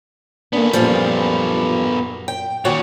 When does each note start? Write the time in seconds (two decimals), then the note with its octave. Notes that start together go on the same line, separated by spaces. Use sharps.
0.53 A#3 B3 D4 A4
0.73 F#2 A#2 F3 G3 F4
2.28 G5
2.65 A#2 D#3 F#4 C#5 F#5